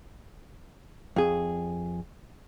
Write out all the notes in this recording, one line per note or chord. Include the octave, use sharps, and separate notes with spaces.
F2 G#4